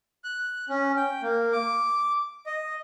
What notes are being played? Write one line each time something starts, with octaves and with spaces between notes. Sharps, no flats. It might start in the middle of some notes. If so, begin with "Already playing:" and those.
F#6
C#4
G5
A#3
D6
D#5